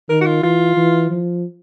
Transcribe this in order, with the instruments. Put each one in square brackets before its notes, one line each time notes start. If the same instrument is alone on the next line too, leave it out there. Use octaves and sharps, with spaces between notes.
[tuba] D#3 [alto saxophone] A#4
[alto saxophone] F#4
F4
[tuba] E3 [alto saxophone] F4
[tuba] E3
F3